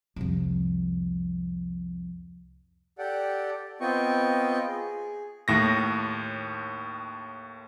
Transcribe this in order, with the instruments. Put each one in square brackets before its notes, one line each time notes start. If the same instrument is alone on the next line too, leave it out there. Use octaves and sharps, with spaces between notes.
[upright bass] C2 F2
[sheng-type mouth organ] G4 A4 D5 F#5 G5
B3 C4 F4 D#5 G5 C#6
G#4
[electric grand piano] D#2 A2 A#6